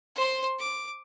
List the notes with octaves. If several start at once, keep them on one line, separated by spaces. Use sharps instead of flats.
C5 C6
D6